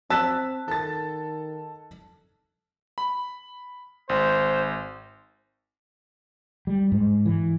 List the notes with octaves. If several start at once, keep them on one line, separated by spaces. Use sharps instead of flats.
C4 A5 E6 F#6 B6
D#3 A4 A6
B5
G#1 C5
G3
G#2
E3